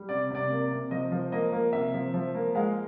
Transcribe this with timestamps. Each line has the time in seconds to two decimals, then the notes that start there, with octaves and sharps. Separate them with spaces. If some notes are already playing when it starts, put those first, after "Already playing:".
Already playing: G3
0.09 C3 D5
0.30 C3 D5
0.50 A#3
0.71 C3
0.91 F3 D#5
1.12 F3
1.32 A#3 D#5
1.53 A#3
1.73 C3 E5
1.93 F3
2.14 F3
2.35 A#3
2.55 G#3 F5